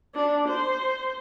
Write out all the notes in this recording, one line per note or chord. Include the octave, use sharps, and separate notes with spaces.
D4
C5